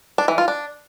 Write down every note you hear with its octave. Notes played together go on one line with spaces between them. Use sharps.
D4
E3
F4
D4